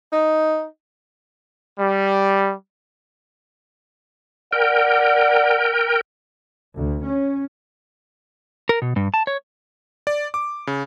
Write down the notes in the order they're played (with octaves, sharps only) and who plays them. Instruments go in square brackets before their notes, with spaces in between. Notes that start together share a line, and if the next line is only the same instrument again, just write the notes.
[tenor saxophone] D#4
[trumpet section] G3
[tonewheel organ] A#4 G5 [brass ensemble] D5 F#5
[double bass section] D2
C#4
[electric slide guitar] A#4
B2
G2
A5
C#5
[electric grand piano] D5
D6
C#3